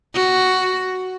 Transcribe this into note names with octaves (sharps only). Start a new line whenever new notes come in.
F#4